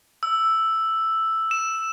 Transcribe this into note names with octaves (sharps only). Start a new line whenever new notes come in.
E6
E7